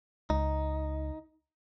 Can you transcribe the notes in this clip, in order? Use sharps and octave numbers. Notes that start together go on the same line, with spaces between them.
C#2 D#4